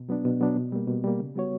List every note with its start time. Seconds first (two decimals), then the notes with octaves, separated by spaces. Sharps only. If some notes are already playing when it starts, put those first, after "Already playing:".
Already playing: B2
0.09 F#3 B3 D4
0.25 B2
0.41 F#3 B3 D4
0.56 B2
0.72 G3 A#3
0.88 B2
1.04 G3 A#3
1.19 C#3
1.35 G3 B3 F#4 C#5